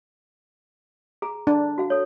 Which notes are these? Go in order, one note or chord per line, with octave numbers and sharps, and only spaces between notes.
G#4 A#5
D4
F#4 F5
A4 C#5